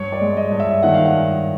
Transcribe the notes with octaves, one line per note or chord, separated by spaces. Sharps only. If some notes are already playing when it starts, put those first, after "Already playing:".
Already playing: G2 C#5
D5
G#3
D#5
G2
E5
D#3 F#5
F5
F#5
G2